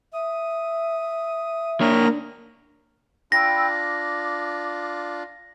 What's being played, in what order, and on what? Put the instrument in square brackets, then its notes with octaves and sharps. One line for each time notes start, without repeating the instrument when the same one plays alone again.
[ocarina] E5 [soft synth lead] D#6
[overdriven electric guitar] A#3 C#5 [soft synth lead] D4 [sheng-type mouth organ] A#4
[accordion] D4 F4 [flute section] G5 B5 E6 [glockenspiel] A#6
[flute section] D6